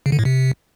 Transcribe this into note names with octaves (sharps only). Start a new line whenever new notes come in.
C#3
D3
A2
C3